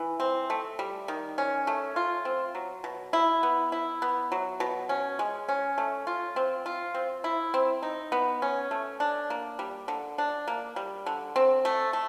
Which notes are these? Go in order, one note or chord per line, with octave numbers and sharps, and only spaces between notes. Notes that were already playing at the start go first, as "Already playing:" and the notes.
Already playing: E3
C4
A3
G3
D#3
C#4
A3
F4
C4
F#3
B2
E4
B3
E4
B3
F#3
B2
C#4
G#3
C#4
A3
F4
C4
F4
C4
E4
C4
D#4
B3
C#4
A3
D4
A#3
G3
D3
D4
A#3
G3
D3
C4
A3
A3